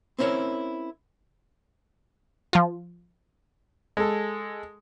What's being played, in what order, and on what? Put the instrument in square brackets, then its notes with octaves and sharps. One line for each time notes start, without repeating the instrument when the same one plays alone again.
[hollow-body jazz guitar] C4 C#4 E4 A#4 C#5
[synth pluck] F3 F4
[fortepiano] G#3 A4